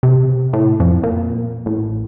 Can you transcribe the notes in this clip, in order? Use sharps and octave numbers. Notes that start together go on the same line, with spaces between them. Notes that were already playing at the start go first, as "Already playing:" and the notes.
C3
A2
F2
A#2
A1